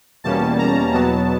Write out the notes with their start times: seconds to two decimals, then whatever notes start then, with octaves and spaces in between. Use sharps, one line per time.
0.24 E2 B2 G3 A#3 C#4 A5
0.59 A#5
0.94 E2 B2 F#3 B3 A5